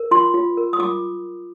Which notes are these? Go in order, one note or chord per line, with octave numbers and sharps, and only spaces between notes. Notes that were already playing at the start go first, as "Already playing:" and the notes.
Already playing: A#4
F4 C6
F4
A#4
D#6
F4 D6